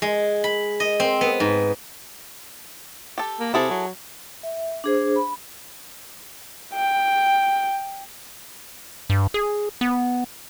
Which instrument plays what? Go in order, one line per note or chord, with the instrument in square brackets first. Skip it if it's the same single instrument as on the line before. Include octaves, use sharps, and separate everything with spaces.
[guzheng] G#3
B5
D#5
C4
B3
G#2
[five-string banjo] G4 A4
[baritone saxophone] A#3
[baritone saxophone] C3 [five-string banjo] E4 G#4 A4
[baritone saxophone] F#3
[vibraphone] E5
D4 G#4 C5
B5
[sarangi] G5
[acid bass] G2
G#4
B3